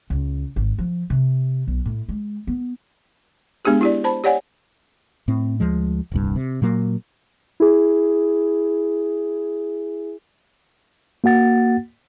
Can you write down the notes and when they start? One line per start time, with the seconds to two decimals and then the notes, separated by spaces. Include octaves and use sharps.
0.10 C#2
0.56 G#1
0.78 F3
1.10 C3
1.67 B1
1.85 A2
2.09 G#3
2.47 B3
3.65 G#3 B3 D4 G4 G#4
3.81 E4 G4 D5
4.04 C5 A5 B5
4.24 G4 C#5 D5 F#5 G#5
5.28 A2 C4
5.60 D2 F3 G#3
6.12 D#1 C2 G2
6.36 C3
6.62 A#2 F#3 A#3
7.60 E4 G#4
11.24 A#3 F#4 F#5 A6